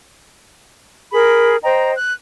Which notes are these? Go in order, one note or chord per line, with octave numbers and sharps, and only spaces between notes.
G#4 A#4 B5
C5 D#5 G5 A#5
F#6